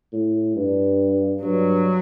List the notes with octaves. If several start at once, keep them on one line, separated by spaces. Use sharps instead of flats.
A2
G2
G2 F#3